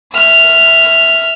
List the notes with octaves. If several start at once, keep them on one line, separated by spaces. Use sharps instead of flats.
E5 F6